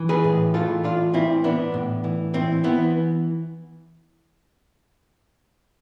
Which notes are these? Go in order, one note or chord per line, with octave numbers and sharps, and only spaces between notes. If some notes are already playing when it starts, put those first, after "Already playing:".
Already playing: E3
G#4 B4
A2
E3 F4 A4
A2 D4 F4
E3 C4 E4
E3 B3 D4
A2
E3
E3 C4
E3 B3